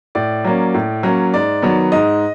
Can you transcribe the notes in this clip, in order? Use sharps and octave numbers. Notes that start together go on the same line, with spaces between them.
A2 D5
F#3 A#3 C#4
A2
F#3 A#3 C#4
G#2 D5
D#3 F#3 B3
G#2 D#5